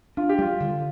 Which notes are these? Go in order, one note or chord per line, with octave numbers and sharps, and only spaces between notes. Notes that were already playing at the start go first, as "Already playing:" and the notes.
D4 F4
G4
G3 F4
D3